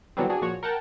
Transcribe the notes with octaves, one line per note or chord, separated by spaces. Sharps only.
D3 E3 F#3 G3 B3 C4
D4 F#4 G#4
A#2 F3 F#4 C#5
A#4 F#5 G5 A5